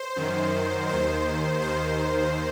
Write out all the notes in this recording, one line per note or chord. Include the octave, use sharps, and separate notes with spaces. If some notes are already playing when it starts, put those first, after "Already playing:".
Already playing: C5
F#2 D#3
D#2 D#3 C5
D#2 D#3 C5